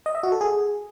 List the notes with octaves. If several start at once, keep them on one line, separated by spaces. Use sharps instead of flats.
D#5
E5
F#4
A4
G#4